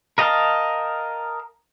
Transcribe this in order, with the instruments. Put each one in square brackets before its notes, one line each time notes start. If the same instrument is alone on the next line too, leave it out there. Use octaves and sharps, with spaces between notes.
[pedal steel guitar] A#4 D#5 F5 G5 A5